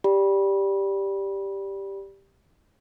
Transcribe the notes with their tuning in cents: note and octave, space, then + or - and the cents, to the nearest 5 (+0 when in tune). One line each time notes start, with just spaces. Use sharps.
G4 +5 D5 -10 B5 -25